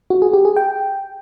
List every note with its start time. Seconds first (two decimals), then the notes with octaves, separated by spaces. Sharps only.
0.10 F#4
0.22 G#4
0.33 G4
0.45 G#4
0.57 G5